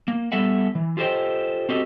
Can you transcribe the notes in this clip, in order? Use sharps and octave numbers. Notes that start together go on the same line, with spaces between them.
A#3
G3 B3 A4 E5 F#5
E3
F4 G4 A4 C5 D#5 G5
C4 F#4 G4 A4 D#5